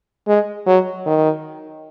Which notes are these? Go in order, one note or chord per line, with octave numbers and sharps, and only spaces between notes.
G#3
F#3
D#3